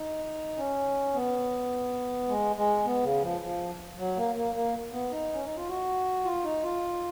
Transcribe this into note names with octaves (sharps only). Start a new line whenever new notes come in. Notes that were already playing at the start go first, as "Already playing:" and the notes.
Already playing: D#4
C#4
B3
G#3
G#3
B3
C#3
F3
F3
F#3
A#3
A#3
A#3
B3
D#4
C#4
D#4
F4
F#4
F4
D#4
F4